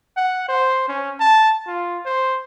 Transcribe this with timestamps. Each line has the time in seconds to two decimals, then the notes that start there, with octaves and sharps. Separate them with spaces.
0.17 F#5
0.48 C5
0.88 C#4
1.20 A5
1.67 F4
2.05 C5